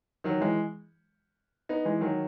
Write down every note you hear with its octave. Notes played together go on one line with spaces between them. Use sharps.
D#3 F#3
E3 G#3
B3 D#4
E3 G#3
D#3 F#3